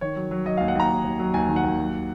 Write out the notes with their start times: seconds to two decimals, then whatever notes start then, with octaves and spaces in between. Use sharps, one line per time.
0.01 D#3 C#5
0.16 F#3
0.31 F#3
0.46 F#3 D#5
0.57 F5
0.61 D#2
0.68 F#5
0.75 D#2 A#5
0.90 D#2
1.05 D#2
1.19 F#3
1.34 D#2 G#5
1.49 D#3
1.56 F#5
1.64 D#2
1.78 F#3